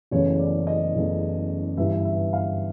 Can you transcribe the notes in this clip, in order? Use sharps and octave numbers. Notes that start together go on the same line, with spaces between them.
F#1 E2 C#3 E3 A3 C#5
D5
D#5
F#1 E2 C#3 E3 A3
G1 G2 E3 E5
E5
F5